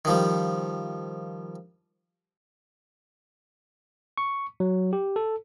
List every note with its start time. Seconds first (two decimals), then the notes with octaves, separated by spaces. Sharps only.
0.05 D#3 F3 G3
4.17 C#6
4.60 F#3
4.93 G4
5.16 A4